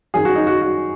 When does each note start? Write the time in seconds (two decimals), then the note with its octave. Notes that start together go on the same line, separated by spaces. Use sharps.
0.14 F#2 D#3 F#3 G#4
0.25 F#4
0.36 D#4
0.47 F#4
0.62 F#4